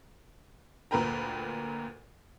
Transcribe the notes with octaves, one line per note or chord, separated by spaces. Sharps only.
D2 A#2 A#4 B4 G5 A#5